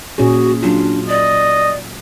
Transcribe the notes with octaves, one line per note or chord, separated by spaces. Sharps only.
A#2 C#4 F#4 G#4
F#3 D4 F4
D5 D#5